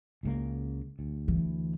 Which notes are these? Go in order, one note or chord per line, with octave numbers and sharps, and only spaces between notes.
C#2 C#3 A#3
D2
E3